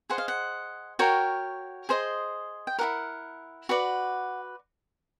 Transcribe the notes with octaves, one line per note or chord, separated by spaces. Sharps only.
G#4 C5 D#5 F#5
F5
F#5
F#4 A#4 C#5 G5
G#4 C5 D#5
G5
E4 G4 A#4 F#5
F#4 B4 D5